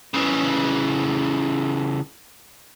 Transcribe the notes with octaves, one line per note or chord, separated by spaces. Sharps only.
C#3 E3